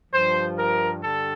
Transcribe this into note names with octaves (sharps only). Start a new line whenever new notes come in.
G2 F3 C5
A#4
G2 D3 A4